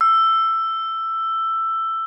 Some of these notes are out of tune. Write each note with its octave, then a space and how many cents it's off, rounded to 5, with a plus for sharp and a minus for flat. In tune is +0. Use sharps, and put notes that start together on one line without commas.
E6 +10